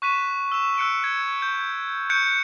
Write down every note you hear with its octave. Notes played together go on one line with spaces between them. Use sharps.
C#6 F#6 B6 D#7 E7
E6 E7
E6 F#6 C#7 D7
E6 G#6
G6
C#6 F#6 G6 C#7 D7